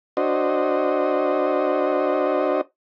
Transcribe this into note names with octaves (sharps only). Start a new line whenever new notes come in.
D4 F#4 C5 D#5